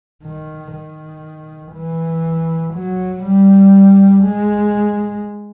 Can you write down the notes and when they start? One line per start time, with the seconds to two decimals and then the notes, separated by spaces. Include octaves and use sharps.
0.23 D#3
0.72 D#3
1.73 E3
2.74 F#3
3.24 G3
4.24 G#3